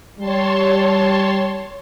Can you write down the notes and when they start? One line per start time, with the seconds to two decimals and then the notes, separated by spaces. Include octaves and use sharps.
0.18 G3 C#5 A5 C6